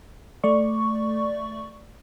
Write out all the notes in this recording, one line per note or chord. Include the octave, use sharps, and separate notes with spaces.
A3 D5 C#6